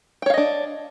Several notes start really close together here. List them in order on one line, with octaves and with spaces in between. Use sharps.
G5 C#5 F5 D#5 D4